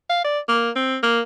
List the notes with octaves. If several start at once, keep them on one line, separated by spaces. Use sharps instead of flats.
F5
D5
A#3
C4
A#3